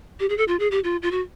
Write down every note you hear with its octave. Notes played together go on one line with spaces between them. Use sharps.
G4
G#4
A4
F4
G#4
G4
F4
F4
F#4